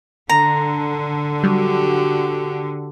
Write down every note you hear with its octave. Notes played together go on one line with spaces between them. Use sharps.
D3 A#5
F#3 G3 F#4 G4